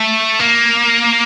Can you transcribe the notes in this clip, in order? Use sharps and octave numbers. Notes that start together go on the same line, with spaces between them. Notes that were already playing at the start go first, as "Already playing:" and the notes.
Already playing: A3
A#3